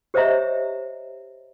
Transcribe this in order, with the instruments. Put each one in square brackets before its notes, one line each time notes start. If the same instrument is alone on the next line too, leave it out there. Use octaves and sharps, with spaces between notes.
[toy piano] G4 C5 C#5 D#5 E5 A#5